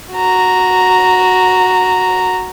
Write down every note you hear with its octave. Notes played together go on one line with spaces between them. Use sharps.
F#4 A#5